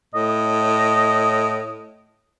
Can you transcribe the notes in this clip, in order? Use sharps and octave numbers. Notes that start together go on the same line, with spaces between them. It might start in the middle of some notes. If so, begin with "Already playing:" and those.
A2 D#5